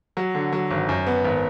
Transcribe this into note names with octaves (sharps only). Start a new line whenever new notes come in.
F#3
D3
F#3
G#1
F#2
B3
G#1